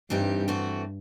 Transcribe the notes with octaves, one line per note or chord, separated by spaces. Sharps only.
G2 E3 G3 C4 D#4 G4
E3 A3 C4 F#4